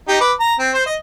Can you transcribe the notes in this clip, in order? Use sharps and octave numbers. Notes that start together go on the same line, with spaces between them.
D#4 G4
B4 D6
A#5
C4
C5
D#5